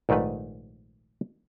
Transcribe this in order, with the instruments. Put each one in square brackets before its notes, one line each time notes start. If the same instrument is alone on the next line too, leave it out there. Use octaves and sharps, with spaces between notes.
[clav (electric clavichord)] A#1 G#2 D#3 A3 B4